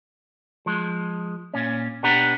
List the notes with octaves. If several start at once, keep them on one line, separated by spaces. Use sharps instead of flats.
F3 G#3
A#2 C#4
B2 B3 D4 G4 F#5 A#5